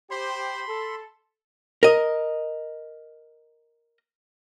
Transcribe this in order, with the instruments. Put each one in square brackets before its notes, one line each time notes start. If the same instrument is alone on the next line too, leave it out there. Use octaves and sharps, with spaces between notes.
[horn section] G4 C5 [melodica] B5 C6
[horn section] A4
[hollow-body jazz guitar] A#4 D#5